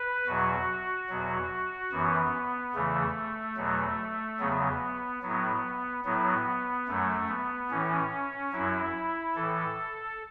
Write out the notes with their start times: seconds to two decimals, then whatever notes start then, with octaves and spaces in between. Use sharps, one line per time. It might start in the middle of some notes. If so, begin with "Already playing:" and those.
Already playing: B4
0.27 E2 B2 F#3 F#4
1.10 E2 B2 F#3
1.92 F#2 E3 B3
2.74 E2 C#3 E3 A3
3.57 E2 B2 F#3
4.39 E2 C#3 F#3 B3
5.23 A2 F#3 B3
6.04 A2 F#3 B3
6.88 F#2 F#3 A3
7.29 B3
7.71 A2 E3 C#4
8.52 F#2 F#3 E4
9.35 A2 E3 A4